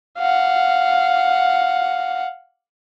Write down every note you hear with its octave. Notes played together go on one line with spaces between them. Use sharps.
F5 F#5